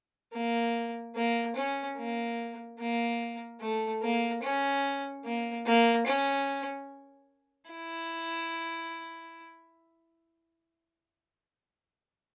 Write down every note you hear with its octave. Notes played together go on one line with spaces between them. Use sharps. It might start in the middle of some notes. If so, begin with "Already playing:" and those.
A#3
A#3
C#4
A#3
A#3
A3
A#3
C#4
A#3
A#3
C#4
E4